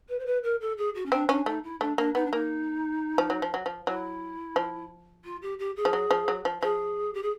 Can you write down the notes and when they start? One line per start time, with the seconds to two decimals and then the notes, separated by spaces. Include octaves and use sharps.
0.09 B4
0.19 C5
0.26 B4
0.43 A#4
0.60 A4
0.77 G#4
0.95 F#4
1.05 C#4
1.12 C4 D4
1.29 C#4 D4
1.46 A3 D#4
1.63 E4
1.80 A3 D4
1.97 A#3 D4
2.15 B3 D#4
2.25 D4
2.32 A#3 D#4
3.18 F3
3.30 F#3
3.42 F3
3.54 F#3
3.66 F3
3.87 F#3 E4
4.56 F3
5.24 F4
5.42 G4
5.59 G4
5.76 G#4
5.85 F3
5.93 F#3
6.11 F3
6.28 F#3
6.45 F3
6.62 F3 G#4
7.14 G4
7.22 G#4